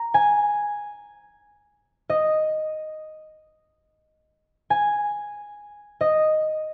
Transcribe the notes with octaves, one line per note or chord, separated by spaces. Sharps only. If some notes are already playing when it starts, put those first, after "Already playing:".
Already playing: A#5
G#5
D#5
G#5
D#5